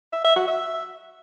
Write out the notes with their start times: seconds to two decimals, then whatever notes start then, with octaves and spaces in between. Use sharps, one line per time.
0.13 E5
0.24 E5
0.36 F#4
0.48 E5